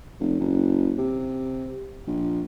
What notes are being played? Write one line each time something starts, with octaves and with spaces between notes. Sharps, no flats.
F1
F#1
C3
A#1